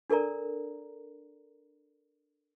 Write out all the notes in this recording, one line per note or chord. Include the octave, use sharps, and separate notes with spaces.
D4 A4 A#4 D5 A#5